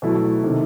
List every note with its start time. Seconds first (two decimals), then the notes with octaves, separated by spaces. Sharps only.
0.02 B2 F#3 A3 E4
0.43 C3 D#3 A3